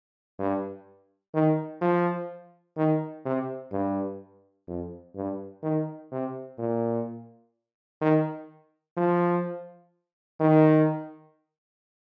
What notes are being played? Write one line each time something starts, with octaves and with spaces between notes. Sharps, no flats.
G2
D#3
F3
D#3
C3
G2
F2
G2
D#3
C3
A#2
D#3
F3
D#3